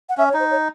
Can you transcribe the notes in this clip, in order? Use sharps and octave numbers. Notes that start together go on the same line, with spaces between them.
F#5
C#4 E5
C#5
D#4
C5
C#5